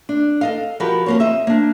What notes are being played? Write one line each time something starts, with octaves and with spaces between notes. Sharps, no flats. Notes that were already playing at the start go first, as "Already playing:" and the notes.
D4
A4 D#5 F5
F3 F#4 G4 A#4 B4
F2 A#3 C#5
C5 D#5 E5
A#3 D4